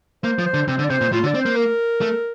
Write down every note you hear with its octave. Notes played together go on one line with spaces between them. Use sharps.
A#3 C5
F3
C5
D3
C3 C5
D3
D5
C3 C5
A#2
A2 F4
D3
D5
C4
A#3 C5
A#4
A3